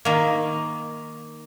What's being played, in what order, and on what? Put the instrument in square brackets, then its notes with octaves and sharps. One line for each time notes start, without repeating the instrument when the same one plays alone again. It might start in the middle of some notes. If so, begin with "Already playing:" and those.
[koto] D#3 A#3